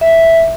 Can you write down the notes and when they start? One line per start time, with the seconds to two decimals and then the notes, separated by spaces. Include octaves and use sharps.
0.01 E5